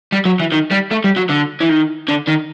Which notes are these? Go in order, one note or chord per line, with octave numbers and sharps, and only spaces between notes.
G3
F#3
E3
D#3
G3
A3
G3
F#3
D3
E3
D#3
D3
D#3